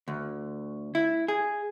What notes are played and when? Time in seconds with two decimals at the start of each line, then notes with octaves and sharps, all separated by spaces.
0.08 D2
0.95 E4
1.28 G#4